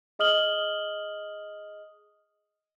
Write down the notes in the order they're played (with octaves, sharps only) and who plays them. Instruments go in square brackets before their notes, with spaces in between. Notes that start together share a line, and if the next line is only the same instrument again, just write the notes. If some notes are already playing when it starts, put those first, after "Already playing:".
[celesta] G#4 D#5 D#6 F6 F#7 G7